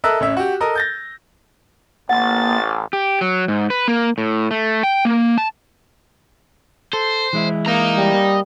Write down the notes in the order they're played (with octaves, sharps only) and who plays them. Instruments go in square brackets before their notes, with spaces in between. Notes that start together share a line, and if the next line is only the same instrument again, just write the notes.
[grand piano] A4 A#4 D#5 E5 E6 F#6
A1 C#4 E5
F#4 G4
A4 A#4 D#5
G6 A6 A#6
[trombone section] A1 [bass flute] A#3 [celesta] F#5 [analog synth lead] A6
[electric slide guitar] G4
F#3
G#2
B4
A#3
A2
A3
G5
A#3
A5
[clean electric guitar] A4 [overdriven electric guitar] C5
[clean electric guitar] E3 G#3 E4
[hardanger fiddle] A#3 [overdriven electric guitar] D#5 A#5
[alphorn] G3